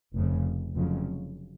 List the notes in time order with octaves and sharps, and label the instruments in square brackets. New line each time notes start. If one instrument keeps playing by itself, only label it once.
[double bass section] F1 F2 C#3
F1 F2 C#3 F#3